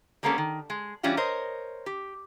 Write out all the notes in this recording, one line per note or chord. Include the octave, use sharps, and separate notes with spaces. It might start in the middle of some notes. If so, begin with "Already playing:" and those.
G3 G#3 A#3 B3 C#4 A4
D#3
G#3
E3 G3 C#4 F4 F#4
A#4 C5 C#5 D#5
G4